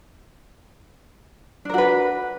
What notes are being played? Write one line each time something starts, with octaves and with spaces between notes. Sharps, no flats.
D4 F#4 A#4 B4